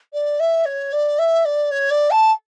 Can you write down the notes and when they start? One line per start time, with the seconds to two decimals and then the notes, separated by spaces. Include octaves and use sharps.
0.13 D5
0.39 E5
0.65 C#5
0.92 D5
1.18 E5
1.45 D5
1.71 C#5
1.90 D5
2.10 A5